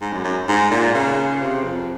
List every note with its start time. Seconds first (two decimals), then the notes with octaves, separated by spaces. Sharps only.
0.01 G#2
0.13 F#2
0.24 F#2
0.48 G#2
0.71 A#2
0.94 C#3
1.41 C3
1.64 F2